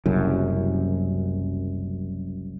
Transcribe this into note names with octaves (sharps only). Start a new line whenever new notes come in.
F#1 C2 F#2